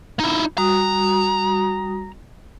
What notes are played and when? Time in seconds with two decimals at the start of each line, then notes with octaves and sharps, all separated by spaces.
0.20 D#4 E4
0.58 G3 F#4 A#5 D#6